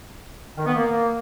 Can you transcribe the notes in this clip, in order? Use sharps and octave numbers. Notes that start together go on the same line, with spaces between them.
D#3
B3
A#3